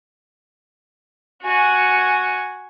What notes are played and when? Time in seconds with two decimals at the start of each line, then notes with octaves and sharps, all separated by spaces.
1.42 F#4 G#5